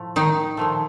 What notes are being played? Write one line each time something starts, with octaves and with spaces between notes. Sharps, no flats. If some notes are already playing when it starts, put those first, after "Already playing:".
Already playing: A2 F3 A3
D#3 D#4
A#2 F3 A3